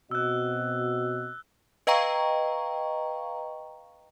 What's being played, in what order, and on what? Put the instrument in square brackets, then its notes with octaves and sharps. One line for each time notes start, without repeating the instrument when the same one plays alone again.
[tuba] B2 [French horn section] C4 F#4 D#5 [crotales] E6 F#6
[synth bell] B4 D#5 F5 G5 A#5 C#6